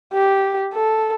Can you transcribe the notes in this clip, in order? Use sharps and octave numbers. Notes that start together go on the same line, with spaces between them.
G4
A4